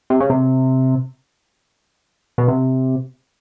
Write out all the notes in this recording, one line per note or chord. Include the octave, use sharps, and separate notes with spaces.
C3
C#3
C3
B2
C3